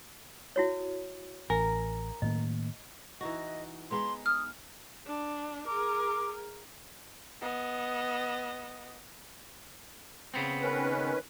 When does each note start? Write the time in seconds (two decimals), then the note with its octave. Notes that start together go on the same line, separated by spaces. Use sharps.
0.56 E4 F#4 C#5
1.50 A1 A#4 G#5
2.22 A2 D#3 A#3 D#5
3.21 E3 D#4 F#4 D#5
3.91 G#3 B3 D#4 C6
4.26 D#6 F6
5.06 D4
5.67 G#4 A#4 D6
7.41 B3 D#5
10.34 C#3 B3 C4
10.62 D#3 C#4 B4